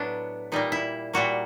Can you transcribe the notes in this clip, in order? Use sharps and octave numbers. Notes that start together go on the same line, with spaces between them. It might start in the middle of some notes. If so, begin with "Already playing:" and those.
Already playing: A2 F#3 B3 D4
A#2 G3 A#3 D#4
E4
A#2 G3 A#3 F#4